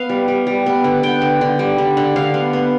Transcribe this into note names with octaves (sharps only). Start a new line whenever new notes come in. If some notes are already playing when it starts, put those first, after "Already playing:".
Already playing: B3 F5
G3
G3
G3
B3
D3
B3 G5
D3
D3
G3
D3
D3
D3 F5
B3
B3